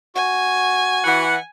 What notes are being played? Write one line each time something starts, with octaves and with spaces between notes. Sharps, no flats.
F#4 G#5
E3 F#5